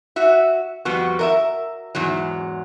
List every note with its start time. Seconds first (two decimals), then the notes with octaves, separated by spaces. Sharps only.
0.16 F#4 E5
0.85 F2 G3 B3 F#4
1.19 A#4 D#5 E5
1.95 E2 G#2 F#3